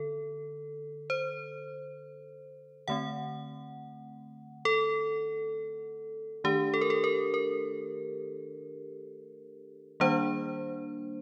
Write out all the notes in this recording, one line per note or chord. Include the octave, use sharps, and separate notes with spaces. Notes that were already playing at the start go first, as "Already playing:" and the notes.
Already playing: D3 A4
C5
D3 A3 C4 F#5
A4
D#3 A3 D4 G4
A4
A#4
A4
A#4
A#4
D#3 G3 A#3 D4 C5